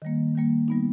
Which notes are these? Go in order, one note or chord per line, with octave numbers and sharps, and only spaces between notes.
D#3 G3 A#3
D#3 G3 A#3
G3 B3 D#4